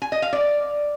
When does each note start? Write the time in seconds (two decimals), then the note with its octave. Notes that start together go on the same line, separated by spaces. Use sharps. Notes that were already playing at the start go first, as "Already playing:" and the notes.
0.02 G#5
0.12 D#5
0.22 F5
0.33 D5